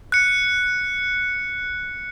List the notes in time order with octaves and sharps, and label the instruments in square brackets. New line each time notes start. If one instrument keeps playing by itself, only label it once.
[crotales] F#6 C#7